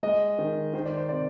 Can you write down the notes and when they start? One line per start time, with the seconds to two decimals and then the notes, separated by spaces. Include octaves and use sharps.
0.03 G#3 D#5
0.39 D#3
0.74 D#3 C5
0.85 D5
0.97 C5
1.09 C3 D5